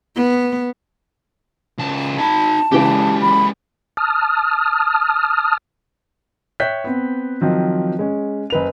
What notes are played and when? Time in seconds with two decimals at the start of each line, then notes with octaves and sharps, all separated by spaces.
0.15 B3
1.78 C#2 A5
2.18 D#4 A5 B5
2.72 C#3 E3 G#3 G4
3.21 B5
3.97 A5 D#6 F6
6.60 C#5 E5 G5 F#6 G6 B6
6.84 B3 C4
7.41 D#3 F3 F#3 C4
7.99 G#3 C#4
8.50 F#1 B4 F7